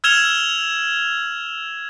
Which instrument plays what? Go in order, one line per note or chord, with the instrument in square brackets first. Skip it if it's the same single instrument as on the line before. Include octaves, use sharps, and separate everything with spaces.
[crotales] E6 F6 G#6 E7 F7 G7